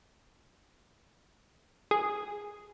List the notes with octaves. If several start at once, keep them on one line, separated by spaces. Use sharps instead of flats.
G#4